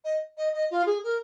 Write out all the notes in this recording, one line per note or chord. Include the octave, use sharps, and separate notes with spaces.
D#5
D#5
D#5
F4
G#4
A#4